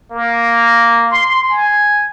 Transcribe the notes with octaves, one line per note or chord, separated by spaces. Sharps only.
A#3
C6
G#5